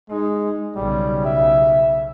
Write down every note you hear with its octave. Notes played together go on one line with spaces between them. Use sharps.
G#3 D#4
B1 C#3 G3
E5